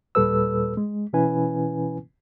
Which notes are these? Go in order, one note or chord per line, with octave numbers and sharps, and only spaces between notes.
D#2 A#2 G3 A4 B4 E6
G#3
B2 E3 C#4 E4 B4 G#5